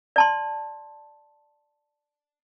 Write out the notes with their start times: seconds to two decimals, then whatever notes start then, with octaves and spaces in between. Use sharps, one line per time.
0.16 D5 A5 C6